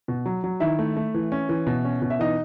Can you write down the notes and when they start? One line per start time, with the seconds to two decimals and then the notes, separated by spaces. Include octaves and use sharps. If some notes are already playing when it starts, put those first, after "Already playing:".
0.08 B2
0.26 F#3
0.44 F#3
0.60 D#3 E4 E5
0.79 A3
0.97 A3
1.14 E3
1.32 C#4
1.49 E3
1.67 B2
1.85 C#4
2.02 B2
2.10 E5
2.19 E3 D#4 D#5